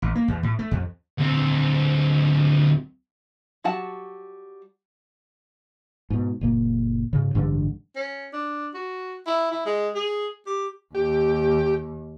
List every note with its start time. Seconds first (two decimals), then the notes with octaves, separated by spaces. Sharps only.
0.02 A1
0.15 A#3
0.28 E2
0.43 A2
0.59 A3
0.71 F2
1.18 D2 C4
3.64 F#3 G3 F#4 F#5 A5
6.10 G#2 B2
6.41 F#1 A#2 A#3
7.13 G#2 C#3
7.34 A1 G2 D3 G#3
7.96 C#4
8.33 D4
8.74 F#4
9.27 E4
9.52 E4
9.66 G#3
9.95 G#4
10.47 G4
10.95 D#2 G4